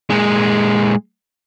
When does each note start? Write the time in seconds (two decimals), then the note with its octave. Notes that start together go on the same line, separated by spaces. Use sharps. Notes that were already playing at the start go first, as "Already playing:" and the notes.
0.10 A#2 G#3